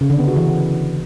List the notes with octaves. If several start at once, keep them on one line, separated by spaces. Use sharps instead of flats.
C#3
D3
B3
F#4
E3